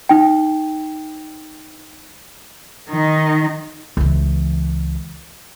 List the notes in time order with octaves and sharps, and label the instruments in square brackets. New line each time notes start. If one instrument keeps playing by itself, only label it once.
[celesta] D#4 G5
[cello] D#3 D#4
[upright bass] C#2 E3